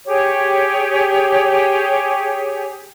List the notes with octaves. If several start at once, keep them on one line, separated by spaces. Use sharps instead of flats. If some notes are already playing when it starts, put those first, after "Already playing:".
G4 G#4 C#5